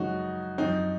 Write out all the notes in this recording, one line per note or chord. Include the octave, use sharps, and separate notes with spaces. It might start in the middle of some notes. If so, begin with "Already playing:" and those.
Already playing: F#2 C#3 F3 G#3 C#4 D#4 F#4
F#2 F3 C4 D#4